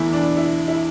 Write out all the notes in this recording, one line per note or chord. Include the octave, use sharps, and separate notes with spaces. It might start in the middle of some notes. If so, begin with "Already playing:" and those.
Already playing: E2 E3 A3 E4
D4
E4
E4